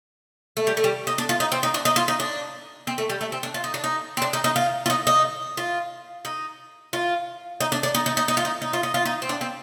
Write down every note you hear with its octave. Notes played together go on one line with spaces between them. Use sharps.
A3
G3
A3
G3
D#4
D4
F4
D#4
C4
D#4
D4
D#4
F4
D#4
D4
C4
A3
G3
A3
C4
D4
F4
D#4
D4
D#4
C4
D4
D#4
D#4
F4
F4
D#4
D#4
F4
D#4
F4
D#4
D4
D4
D#4
D#4
D#4
D#4
F4
D#4
D#4
F4
D#4
F4
D#4
C4
D4
C4